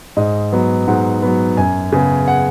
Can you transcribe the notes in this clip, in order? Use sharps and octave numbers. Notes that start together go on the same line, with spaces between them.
G#2 D#5
F#3 B3
G#2 F#5
F#3 B3
F#2 G#5
C#3 B3
F#5